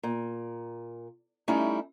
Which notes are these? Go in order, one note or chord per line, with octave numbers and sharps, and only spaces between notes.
A#2
G3 A3 C#4 D#4 E4